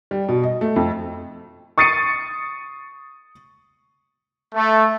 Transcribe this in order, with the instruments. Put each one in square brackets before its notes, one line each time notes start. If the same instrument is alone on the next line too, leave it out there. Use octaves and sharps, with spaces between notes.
[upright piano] G3
B2
D#5
A3
F2
C#6 D#6 A6 C7 C#7 D#7
[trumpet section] A3